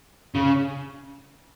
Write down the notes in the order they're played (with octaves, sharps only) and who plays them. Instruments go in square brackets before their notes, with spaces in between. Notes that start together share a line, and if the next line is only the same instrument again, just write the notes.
[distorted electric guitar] C#3